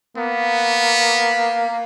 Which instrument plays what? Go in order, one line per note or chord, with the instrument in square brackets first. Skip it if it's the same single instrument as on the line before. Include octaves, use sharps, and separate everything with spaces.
[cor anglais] A#3 [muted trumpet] B3